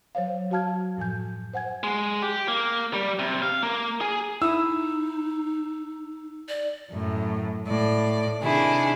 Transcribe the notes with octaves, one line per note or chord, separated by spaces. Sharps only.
F#3 C5 C#5 F5
F#3 F#4 F5 A5 F6 G#6
F#2 A2 F3 G#5 G6
C5 F#5 G#5 G#6
G#3
G4
A#3
G3
C3
F5
A#3
G#4
D#4 E4 D#6 E6
D5
F#2 A2
A2 D5
C3 D#3 D4 E4 G#4